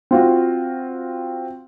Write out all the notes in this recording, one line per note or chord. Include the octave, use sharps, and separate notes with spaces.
C4 F4 F#4